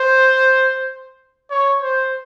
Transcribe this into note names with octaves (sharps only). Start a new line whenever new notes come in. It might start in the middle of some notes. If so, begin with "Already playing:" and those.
Already playing: C5
C#5
C5